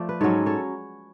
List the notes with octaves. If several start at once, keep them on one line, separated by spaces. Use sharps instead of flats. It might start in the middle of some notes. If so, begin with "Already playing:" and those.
Already playing: F3 A3 D5
B4
G#2 F#3 C#4 A4 C#5
A4 C#5